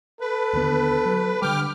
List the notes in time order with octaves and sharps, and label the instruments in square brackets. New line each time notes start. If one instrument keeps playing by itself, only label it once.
[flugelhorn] A4 [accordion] B4
[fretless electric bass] D#2 D3 B3
F#3
[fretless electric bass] D3 G3 [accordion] G5 D6 F6